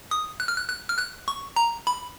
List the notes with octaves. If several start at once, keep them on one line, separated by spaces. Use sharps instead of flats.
D#6
F#6
F6
F#6
F#6
F6
F#6
C#6
A#5
B5